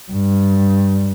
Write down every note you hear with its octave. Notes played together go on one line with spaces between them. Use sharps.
G2